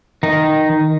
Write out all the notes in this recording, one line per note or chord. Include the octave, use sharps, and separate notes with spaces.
D#3 D#4